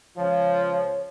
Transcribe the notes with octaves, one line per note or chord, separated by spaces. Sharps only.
C#2 F3 C#5